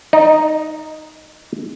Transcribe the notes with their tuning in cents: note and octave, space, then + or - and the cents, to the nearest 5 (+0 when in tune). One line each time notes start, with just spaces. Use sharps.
D#4 +0 D5 +45